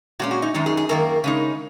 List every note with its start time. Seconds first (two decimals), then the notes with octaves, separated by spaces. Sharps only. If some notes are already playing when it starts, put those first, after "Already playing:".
0.19 A#2 G#3 C#4 F#4
0.31 F#4
0.42 D#4
0.54 F#2 D#3 G#3 D#4
0.66 G#4
0.77 G#4
0.89 F#2 D#3 A#3 A#4
1.24 C#3 G#3 D#4